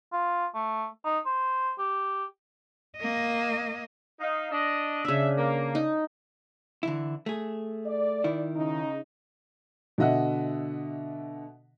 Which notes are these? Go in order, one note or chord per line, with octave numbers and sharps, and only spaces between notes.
F4
A3
D#4
C5
G4
A#3 D#5
D#4 F5
D4 D#5
C#3 D4 E5
A#3
D#4
D3 E3 E4
A3 G#4
D5
D#3 E4
C#3 D#4
B2 D3 D#5 E5 F#5